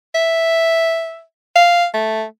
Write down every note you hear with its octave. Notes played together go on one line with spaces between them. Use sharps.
E5
F5
A3